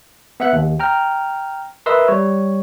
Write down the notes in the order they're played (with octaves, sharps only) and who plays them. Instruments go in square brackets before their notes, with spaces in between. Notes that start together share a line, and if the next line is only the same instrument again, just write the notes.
[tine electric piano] B3 E5 F#5 F#6
D#2
G5 A#5 F6
A#4 B4 D#5 E5 C6 E6
G3 C#5